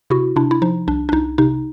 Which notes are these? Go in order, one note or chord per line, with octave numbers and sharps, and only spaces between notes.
C3 E4 F#4
C3 D4 E4
E4
F3 D#4
C2 D4
D4
C2 D#4
C3 D#4